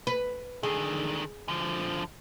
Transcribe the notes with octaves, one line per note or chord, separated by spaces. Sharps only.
B4
D3 D#3 G#4
D3 F3